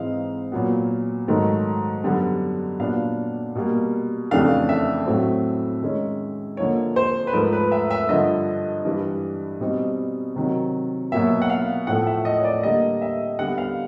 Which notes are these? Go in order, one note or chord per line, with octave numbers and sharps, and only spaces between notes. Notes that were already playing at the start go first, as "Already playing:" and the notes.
Already playing: G#2 E3 G#3 C4 D#4 F5
A#2 F#3 B3
G#2 D#3 F#3 A3
F#2 D3 G3 B3
A#2 F#3 B3 D4 F5
B2 G3 A#3
F2 C#3 E3 A3 D4 F5
E5
A2 F#3 A3 C4
D#3 G#3 C#4
D3 F3 A#3 D#4 C#5
C5
B4
G#2 F3 A3 A#4
B4
E5
E5
G2 D3 F3 D#5
G2 E3 G3
B2 G3 C4 D#4
C3 D#3 F#3
B2 F#3 A#3 E5
F#5
F5
A2 F3 A3 F#5
E5
D#5
C#5
D5
D3 G3 A#3 D#5
E5
D3 G3 B3 F#5
F5